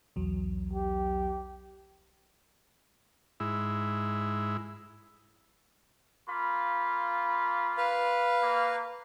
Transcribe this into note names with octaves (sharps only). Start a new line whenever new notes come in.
B1 E2 F#3
G4
G#2 E4
A#3 F4 B5
B4 F5
A#3